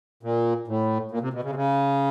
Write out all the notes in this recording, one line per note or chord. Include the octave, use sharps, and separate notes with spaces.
A#2
A2
A#2
C3
B2
C#3
C3
C#3